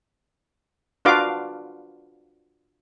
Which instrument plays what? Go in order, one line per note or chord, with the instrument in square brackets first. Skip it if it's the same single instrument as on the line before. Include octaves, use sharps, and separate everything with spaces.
[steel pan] D4 F4 F#4 B4 F5 D6